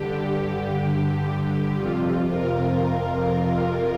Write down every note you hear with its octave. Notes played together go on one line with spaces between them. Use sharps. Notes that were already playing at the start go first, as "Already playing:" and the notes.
Already playing: G2 D3 G4
G4
G4
F2 C3 F4
F4 A#4